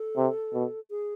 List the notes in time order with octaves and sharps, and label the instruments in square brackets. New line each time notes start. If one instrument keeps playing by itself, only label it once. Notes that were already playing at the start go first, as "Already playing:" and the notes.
Already playing: [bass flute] A4
[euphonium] C3
B2
[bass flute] G#4